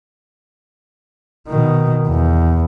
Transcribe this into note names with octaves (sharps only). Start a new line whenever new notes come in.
B2 D#3
E2